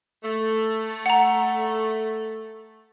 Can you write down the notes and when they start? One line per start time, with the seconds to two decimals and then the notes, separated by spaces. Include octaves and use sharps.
0.23 A3
1.06 F#5 A#5